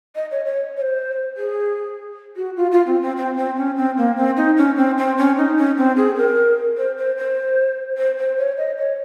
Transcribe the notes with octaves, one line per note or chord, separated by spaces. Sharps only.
D#5
C#5
C#5
C#5
C5
G#4
F#4
F4
F4
C4
C4
C4
C4
C#4
C4
A#3
C4
D#4
C#4
C4
C4
C#4
D#4
C#4
C4
G#4
A#4
C5
C5
C5
C5
C5
C#5
D#5
C#5